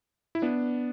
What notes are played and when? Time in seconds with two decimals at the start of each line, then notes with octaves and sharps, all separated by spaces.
0.35 E4
0.42 B3 D4